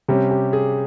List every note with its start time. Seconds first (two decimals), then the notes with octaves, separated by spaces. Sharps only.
0.08 C3 G3 C#4 G4
0.31 G4
0.53 G#4